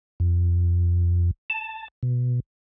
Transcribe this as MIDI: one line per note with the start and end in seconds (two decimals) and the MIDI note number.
0.20 1.31 41
1.50 1.88 81
2.03 2.40 47